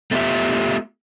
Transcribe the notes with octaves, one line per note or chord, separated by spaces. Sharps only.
A3 B3 D4 F4 G4 E5